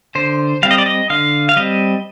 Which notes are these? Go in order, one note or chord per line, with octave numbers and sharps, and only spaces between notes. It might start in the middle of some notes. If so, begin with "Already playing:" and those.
D3 C5
G3 C4 F5
D#5
D5
D#5
D3 F5
F5
G3 C4 D#5